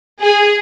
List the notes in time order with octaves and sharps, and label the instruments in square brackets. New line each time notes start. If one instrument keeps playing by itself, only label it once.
[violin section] G#4